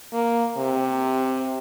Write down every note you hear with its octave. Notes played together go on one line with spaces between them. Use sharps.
A#3
C3